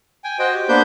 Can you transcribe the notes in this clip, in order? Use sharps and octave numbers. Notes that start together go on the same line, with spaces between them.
G5 G#5
F#4 C5 D#5 G5
G4
A#3 B3 D4 B4 C5 G6